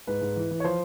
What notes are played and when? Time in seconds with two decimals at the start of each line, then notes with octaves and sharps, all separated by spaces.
0.07 G#2 B4
0.21 G#2
0.36 E3
0.51 E3
0.60 C#5
0.64 F3 C5